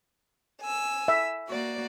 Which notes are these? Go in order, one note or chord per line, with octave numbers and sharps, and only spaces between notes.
G#5 E6
E5
A#3 F#4 D5